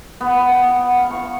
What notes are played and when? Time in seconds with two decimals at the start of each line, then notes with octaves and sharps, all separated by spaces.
0.21 B3
0.49 G5
0.69 F#5
0.97 F5
1.11 C#6